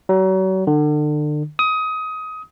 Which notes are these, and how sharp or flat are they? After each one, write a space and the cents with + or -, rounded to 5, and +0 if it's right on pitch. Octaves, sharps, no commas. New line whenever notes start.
F#3 +35
D3 +35
D#6 +20